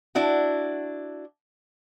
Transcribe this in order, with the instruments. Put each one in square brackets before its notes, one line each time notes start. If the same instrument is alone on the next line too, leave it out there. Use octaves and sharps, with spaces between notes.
[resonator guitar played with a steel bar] D4 E4 F#4